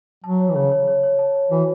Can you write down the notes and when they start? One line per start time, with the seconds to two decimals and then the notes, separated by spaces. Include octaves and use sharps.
0.24 F#3 A5
0.40 C#5
0.49 E3
0.55 C#3 C#5
0.71 C#5
0.87 C#5
1.03 C#5
1.19 A5
1.35 C#5
1.51 E3 F#4